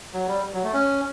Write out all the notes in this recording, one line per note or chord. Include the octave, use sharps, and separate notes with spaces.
F#3
G3
F#3
A3
C#4